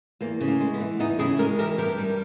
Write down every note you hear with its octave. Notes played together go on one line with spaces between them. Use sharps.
E2 A#3
C#3
A#3
G#3
B3
E3
E2 B3 D#4
C#3 E4 G#4
G#3 G4 A#4
E3 G4 A#4
G2 G4 A#4
G3